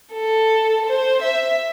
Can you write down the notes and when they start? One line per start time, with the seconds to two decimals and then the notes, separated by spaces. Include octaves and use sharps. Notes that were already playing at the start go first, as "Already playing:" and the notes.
0.13 A4
0.86 C5
1.22 E5